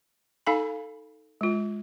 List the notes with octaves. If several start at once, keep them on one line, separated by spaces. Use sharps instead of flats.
D#4 A4 F5 G#5 B5
G#3 F4